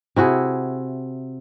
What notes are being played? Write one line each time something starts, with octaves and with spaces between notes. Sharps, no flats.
C3 E4 F#4 G#4